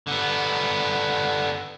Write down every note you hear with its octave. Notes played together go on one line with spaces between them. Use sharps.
D3 B3